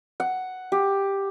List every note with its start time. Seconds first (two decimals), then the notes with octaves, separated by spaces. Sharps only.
0.20 F#5
0.72 G4